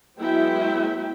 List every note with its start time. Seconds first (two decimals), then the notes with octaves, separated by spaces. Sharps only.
0.18 F#3 G#3 B3 E4 E5 G5